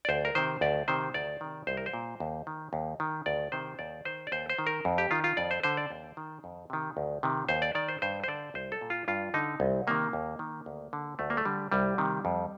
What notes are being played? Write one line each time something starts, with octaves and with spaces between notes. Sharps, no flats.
D5
D2 C5
A#4
C3 D#3 C5
D2 D5
C3 D#3 C5
D2 D5
C3 D#3
C2 C5
A#4
C5
A#2
D#2
D#3
D#2
D#3
D2 D5
C3 D#3 C5
D#2 D5
D#3 C5
D5
D#2 C5
C5
D#3
A#4
F2
G4
D#3 F4
F4
F2 D5
C5
D3 C5
D5
D#2
D#3
F2
C3 D#3
D2
C3 D#3
D#2 C5
D5
D#3 D5
C5
G2 C5
C5
D3 D5
C2 C5
A4
A#2
F4
G2 F4
D3 D#4
C2
C3 D#3 A#3
D#2
D#3
D2
D3
D2 A3
A#3
A3
D3 G3
C2 G3
C3 D#3
F2